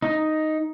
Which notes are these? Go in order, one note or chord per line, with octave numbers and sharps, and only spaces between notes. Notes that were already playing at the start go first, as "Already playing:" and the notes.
D#4